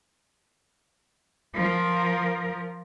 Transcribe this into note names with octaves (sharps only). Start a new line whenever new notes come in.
F3 A#4